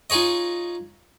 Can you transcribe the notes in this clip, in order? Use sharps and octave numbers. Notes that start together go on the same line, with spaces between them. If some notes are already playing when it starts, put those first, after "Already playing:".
D#4 F4 G#4 C#5 D#5